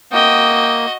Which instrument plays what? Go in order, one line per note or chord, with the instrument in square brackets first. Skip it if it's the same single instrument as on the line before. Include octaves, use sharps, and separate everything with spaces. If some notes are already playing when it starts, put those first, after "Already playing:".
[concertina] A#3 [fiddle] F#4 D#5 [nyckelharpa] G5 D#6